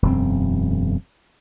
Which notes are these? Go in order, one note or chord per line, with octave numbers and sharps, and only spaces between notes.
E1 F#2 C4